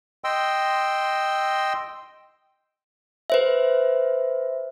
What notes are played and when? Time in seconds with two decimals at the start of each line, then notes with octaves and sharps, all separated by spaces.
0.24 D#5 G5 C6 E6
3.30 B4 C5 E5